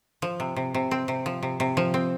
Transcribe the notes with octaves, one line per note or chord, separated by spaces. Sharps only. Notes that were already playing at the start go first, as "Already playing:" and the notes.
F3
C3
C3
C3
C4
C3
F3
C3
C3
F3
C4